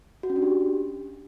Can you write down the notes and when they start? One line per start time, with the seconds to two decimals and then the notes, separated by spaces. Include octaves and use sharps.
0.23 F#4
0.30 C#4
0.36 D4
0.42 G4